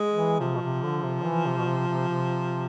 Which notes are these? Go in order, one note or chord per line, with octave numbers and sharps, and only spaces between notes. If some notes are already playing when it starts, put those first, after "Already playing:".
Already playing: G#3
E3
C3 F3
B2
C3
D3
C3
E3
C3
B2
C3
C3
C3